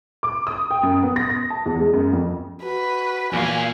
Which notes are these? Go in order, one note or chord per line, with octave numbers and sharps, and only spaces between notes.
D6
D#6
G5
F#2
B3
A#6
A#6
A5
E2
G#3
F#2
F2
F#4 B4
E2 A#2 F5 G#5